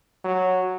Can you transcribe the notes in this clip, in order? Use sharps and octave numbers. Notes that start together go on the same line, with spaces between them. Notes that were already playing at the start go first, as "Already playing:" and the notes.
F#3